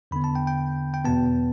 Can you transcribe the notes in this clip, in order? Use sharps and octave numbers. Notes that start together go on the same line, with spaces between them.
E2 D3 B3 B5
A5
G5
G5
G5
E2 B2 B3 A5